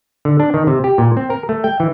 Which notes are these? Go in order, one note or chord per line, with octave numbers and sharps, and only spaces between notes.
D3
D4
D#3
C3
G4
A#2
C4
A#4
A3
G5
E3